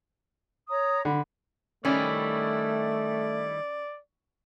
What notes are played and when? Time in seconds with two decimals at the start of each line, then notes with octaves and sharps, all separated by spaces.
0.69 C#5 A#5 D#6
1.05 D3 B5
1.85 D#3 G3 A3 C#4 E4 D5